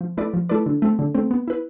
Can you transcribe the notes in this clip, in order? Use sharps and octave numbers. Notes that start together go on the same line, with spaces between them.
F3
A3 E4 B4 D5
F3
A3 E4 B4 D5
D3
A3 C4
D3
A3 C4
B3
E4 B4